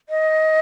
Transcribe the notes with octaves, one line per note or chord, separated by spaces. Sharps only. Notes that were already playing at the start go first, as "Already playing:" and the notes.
D#5